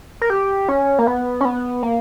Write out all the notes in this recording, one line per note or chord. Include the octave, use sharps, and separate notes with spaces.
A#4
G4
C#4
A#3
B3
C#4
B3
A#3